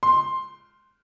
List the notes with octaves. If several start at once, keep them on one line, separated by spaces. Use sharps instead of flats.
C6